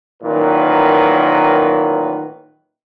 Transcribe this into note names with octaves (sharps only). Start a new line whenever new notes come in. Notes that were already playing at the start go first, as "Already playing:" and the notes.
A1 A#2 D#3 F#3 E4 B4